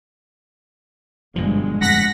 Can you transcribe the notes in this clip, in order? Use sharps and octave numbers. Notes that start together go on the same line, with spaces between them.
G1 G2 B2 F3 G#3
D1 F2 F#5 A#6 B6